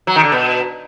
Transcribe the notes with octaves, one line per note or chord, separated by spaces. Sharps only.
F#3
D#3
D3
B2